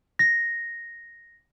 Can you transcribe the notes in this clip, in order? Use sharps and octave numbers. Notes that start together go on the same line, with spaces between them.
A#6